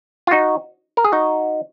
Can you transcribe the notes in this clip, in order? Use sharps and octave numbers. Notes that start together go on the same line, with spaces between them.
F4
D#4 F#4
A#4
G#4
D#4 F#4